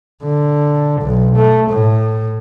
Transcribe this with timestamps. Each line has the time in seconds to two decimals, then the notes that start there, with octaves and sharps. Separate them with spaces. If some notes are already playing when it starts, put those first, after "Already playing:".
0.23 D3
1.02 B1
1.36 A3
1.71 A2